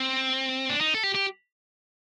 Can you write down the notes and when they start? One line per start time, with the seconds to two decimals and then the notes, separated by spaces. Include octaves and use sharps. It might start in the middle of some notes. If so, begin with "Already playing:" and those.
Already playing: C4
0.69 D4
0.81 D#4
0.94 A4
1.03 G4
1.15 G4